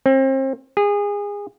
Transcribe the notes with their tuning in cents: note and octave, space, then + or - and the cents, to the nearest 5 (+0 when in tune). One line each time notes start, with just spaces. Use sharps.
C4 +35
G#4 -25